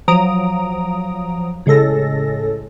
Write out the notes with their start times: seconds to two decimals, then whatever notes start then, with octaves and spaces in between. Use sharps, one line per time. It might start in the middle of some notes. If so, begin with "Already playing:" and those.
0.08 F3 F#3 A#5 D#6 D7
1.66 A2 C#3 G#3 A4 A#6